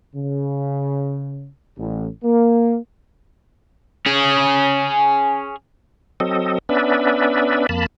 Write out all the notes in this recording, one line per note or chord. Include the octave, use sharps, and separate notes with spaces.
C#3
A1
A#3
C#4 G#4
F#3 C4 A4 D#5
B3 C#4 D4 B4 D5 E5
F2 A#3 A5 B5